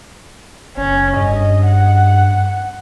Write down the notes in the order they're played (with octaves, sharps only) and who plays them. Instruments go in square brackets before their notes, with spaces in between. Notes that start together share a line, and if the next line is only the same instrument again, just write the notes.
[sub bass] F#1 [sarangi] C#4
[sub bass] G2 [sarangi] D#5
[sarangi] F#5